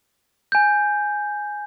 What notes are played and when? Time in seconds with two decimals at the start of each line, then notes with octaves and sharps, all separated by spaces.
0.52 G#5 G6